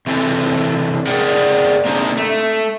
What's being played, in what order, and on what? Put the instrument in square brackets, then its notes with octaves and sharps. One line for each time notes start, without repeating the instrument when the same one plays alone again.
[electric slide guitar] C3 E3 C4 A4
G#4 A#4 D5 F#5 G5
A#3 C4 D4 D#4 G4
A3